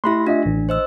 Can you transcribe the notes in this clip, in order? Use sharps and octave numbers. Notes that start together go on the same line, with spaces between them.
A3 E4 G4 B5 C6 A#6
D4 F4 D#5 E5
A1
C5 D#5 E6